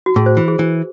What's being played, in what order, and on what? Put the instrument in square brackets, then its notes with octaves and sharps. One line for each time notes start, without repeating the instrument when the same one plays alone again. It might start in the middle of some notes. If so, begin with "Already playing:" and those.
[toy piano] F#4
[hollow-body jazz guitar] A2 [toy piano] G#4
[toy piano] C5
[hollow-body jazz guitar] E3
[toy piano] G#4
[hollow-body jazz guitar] E3